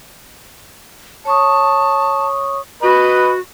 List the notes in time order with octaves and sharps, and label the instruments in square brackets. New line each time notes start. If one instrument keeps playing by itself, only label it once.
[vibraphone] C#5 C#6 D#6 [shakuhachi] A5
[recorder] F#4 [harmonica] B4 D#5 B5